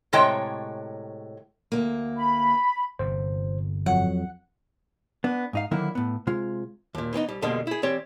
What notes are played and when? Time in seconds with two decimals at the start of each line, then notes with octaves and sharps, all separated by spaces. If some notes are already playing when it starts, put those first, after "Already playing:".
0.13 A2 C3 G#3 C#5 G5 A#5
1.72 D2 A#3
2.17 B5
2.99 G1 C3 C5
3.86 F2 F#3 F#5
5.24 B3 D4
5.53 G#2 D#4 F5
5.71 D3 D#3 F#3 A#3 D#4 E4
5.95 A2 B3
6.27 C3 G#3 F4
6.95 D#2 A#2
7.13 E3 B3 C4 D#4
7.28 C2 G3
7.42 F2 B2 D3 G3 G#3 A#3
7.67 E4 G#4
7.83 E3 C4 G4 C#5 D5